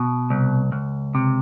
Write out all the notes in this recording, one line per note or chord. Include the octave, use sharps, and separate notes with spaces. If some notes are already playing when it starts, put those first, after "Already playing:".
Already playing: B2
C2
C#2
C3